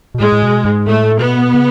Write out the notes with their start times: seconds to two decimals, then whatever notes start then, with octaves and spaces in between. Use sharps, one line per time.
0.14 B2
0.20 A2 G#3
0.32 A2
0.42 B2
0.65 G#2
0.87 A2 A3
1.20 B2 B3
1.55 C#3